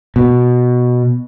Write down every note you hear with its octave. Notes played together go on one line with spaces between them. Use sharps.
B2